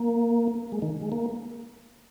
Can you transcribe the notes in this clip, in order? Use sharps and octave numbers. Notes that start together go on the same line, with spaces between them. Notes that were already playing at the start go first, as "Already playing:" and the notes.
Already playing: A#3
G#3
D#3
G#3
A#3